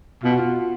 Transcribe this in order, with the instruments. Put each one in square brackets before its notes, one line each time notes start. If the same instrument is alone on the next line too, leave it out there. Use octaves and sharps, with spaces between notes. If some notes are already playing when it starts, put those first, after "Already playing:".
[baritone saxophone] B2 [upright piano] F4
[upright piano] F#4
F4